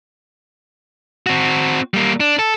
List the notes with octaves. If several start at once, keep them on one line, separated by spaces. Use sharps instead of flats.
C4 F#4
G3 A#3
D4
A4